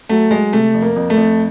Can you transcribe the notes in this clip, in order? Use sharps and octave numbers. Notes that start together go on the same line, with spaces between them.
F#3 A3
F#3 G#3
C3 A3
F2
A#3
F2
A3
F2